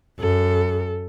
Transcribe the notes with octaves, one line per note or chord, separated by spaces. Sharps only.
F#2 A4